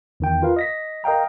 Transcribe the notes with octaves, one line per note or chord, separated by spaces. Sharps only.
E2 D#3 G5
F4 A#4 B4 F5
D#5 A#6 B6
A#4 D#5 F5 G5 A#5